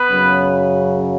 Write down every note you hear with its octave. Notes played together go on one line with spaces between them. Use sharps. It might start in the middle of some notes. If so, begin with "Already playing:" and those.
Already playing: B3 B4
F#2 C#3 F#3